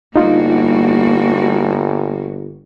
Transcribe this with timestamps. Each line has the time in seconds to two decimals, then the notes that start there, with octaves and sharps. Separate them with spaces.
0.16 G1 G3 A#3 D#4 F4 F#4